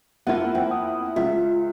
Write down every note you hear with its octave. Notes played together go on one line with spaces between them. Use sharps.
F2 A#3 B3 E4 F4 F#5
E2 C4 G5
D#6
C#2 F4 E5